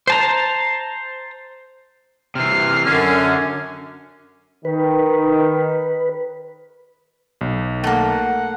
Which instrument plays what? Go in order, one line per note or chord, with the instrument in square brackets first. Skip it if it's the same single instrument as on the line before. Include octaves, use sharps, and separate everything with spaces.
[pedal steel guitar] C5 A5 A#5
[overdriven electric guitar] C3 E3 [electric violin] F6 C7
[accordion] F#2 [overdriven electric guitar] D3 [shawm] C#4
[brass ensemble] D#3 [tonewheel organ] B4
[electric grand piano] B1
[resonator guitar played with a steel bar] A3 A#3 [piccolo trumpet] F#5